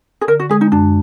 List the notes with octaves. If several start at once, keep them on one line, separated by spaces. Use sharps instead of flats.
G#4
D3 A#4
F#4
G#3 G#4
D#4
F#2 D4